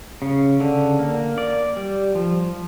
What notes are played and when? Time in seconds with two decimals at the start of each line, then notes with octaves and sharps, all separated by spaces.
0.22 C#3
0.60 D3
0.99 A#3
1.38 D5
1.76 G3
2.15 F3